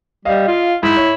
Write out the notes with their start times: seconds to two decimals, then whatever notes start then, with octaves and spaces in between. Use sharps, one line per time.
0.25 G3 D#5 F5
0.48 F4
0.83 G#2 E4
0.97 C#5